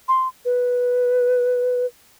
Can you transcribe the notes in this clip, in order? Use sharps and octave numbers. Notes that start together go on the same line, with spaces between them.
C6
B4